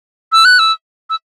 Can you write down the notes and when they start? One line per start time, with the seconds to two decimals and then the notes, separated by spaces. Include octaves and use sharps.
0.32 E6
0.45 F#6
0.59 E6
1.10 E6